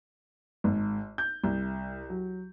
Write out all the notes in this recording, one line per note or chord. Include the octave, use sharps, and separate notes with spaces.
G#1
G6
C2
F#3